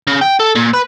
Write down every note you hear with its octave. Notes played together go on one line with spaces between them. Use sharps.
C#3
G5
A4
A#2
B4